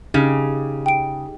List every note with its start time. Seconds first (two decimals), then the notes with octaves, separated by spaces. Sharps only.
0.14 C#3 D#4 G4 G#4
0.86 G5 D7